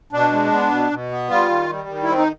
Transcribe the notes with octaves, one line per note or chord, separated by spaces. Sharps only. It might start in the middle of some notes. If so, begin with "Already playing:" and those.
B2 D4
G#3
B3
B2
B2
B3
G3 F4
D#3
G3
D#3
E4
C4
D#4